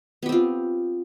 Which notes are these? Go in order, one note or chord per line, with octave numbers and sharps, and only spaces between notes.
B3 C4 F4 G4